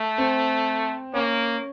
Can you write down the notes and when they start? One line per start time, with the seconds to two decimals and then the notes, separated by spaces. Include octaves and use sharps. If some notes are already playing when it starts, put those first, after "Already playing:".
Already playing: A3
0.18 C4
1.14 A#3 C#4